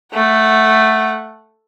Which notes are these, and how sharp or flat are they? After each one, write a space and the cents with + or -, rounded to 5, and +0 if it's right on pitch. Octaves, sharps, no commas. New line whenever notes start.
A3 +0 F#5 +0